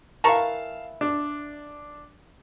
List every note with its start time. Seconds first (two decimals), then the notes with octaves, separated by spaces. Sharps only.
0.24 E3 A#4 F5 A5 C#6
1.01 D4